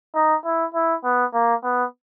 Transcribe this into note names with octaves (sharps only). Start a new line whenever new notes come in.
D#4
E4
E4
B3
A#3
B3